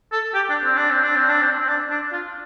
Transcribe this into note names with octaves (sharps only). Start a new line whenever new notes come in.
A4
G4
D4
C4
D4
C4
D4
C4
D4
C4
C4
D4
D4
F4